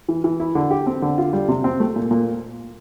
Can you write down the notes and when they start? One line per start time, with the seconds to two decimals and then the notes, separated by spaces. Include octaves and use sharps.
0.08 E3
0.24 E3
0.40 E4
0.55 D3
0.71 G4
0.87 C4
1.02 D3
1.18 F4
1.33 G3
1.48 C3
1.64 C4
1.80 A3
1.96 A#2
2.11 A#2